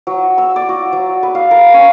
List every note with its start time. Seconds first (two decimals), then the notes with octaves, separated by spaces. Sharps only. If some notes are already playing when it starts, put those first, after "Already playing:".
0.07 F#3
0.38 E6
0.56 D5
0.69 F#4
0.93 F#3
1.23 B4
1.35 F5
1.51 A#4
1.74 C#4